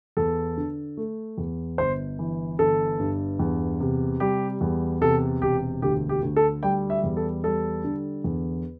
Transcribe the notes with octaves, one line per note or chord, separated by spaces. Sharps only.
E2 A4
D3
A3
E2
G1 C5
E3
G1 A4
G2
E2
C3
G3 G4
E2
C3 A4
E1 G4
D2 G4
G4
D2
A4
G3 G5
E5
E2
A4
G3 A4
D3
E2